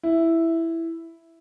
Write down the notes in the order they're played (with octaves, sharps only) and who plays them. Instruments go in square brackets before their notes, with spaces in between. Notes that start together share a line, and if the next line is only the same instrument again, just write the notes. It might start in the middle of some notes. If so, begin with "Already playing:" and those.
[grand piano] E4